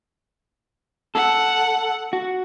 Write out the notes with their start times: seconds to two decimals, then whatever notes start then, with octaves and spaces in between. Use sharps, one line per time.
1.15 A4 F#5
2.13 F#4